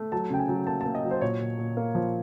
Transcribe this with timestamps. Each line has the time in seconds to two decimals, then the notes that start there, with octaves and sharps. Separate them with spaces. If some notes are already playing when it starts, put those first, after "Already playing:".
Already playing: A3
0.12 F#3 A5
0.30 C#3 G5
0.39 G#5
0.49 F#3
0.67 A#3 A5
0.81 A5
0.85 A#3
0.95 D#5
1.04 F#3
1.11 C5
1.21 A#2 C#5
1.40 A#2
1.59 A#2
1.77 A#3
1.95 F3